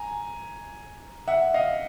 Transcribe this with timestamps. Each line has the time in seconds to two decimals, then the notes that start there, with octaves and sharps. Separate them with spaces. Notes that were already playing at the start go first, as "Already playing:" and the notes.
Already playing: G#5 A#5
1.28 E5 F#5
1.54 D#5 F5